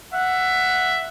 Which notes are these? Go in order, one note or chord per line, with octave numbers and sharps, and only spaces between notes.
E5 F#5